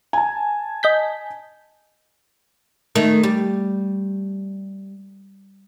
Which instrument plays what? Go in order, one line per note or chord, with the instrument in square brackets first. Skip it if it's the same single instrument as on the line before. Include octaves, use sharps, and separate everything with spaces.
[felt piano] G#5 A5
[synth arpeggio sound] D#5 G6 B6
[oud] D#3 A3
G3